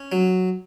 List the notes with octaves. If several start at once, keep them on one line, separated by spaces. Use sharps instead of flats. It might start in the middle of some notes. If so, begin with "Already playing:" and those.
Already playing: C#4
F#3